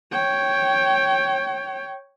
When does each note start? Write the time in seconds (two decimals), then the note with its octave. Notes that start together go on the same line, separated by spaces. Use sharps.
0.12 C#5 G5